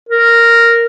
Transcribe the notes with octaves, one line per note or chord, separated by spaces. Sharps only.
A#4